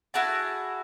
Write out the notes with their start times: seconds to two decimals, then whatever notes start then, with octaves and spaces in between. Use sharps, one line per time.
0.14 E4 F#4 G#4 A5